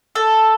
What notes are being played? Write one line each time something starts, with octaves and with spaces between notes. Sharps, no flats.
A4